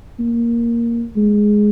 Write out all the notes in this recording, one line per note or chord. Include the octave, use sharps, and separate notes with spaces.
A#3
G#3